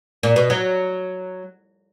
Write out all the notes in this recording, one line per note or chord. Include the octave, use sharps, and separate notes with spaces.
A#2
B2
F#3